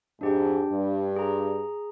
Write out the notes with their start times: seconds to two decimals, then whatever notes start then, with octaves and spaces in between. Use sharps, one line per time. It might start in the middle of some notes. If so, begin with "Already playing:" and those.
0.21 F2 G#2 D4 G4 G5
0.69 G2
1.16 G#4 A#5